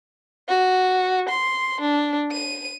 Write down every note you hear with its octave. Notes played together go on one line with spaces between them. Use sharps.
F#4
C6
D4
D#7